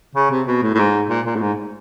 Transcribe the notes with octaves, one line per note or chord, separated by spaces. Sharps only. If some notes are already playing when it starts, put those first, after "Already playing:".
C#3
C3
B2
A2
A2
G#2
A#2
A#2
A2
G#2